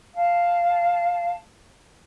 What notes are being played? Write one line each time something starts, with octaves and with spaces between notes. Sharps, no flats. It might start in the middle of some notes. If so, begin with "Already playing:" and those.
F5 A5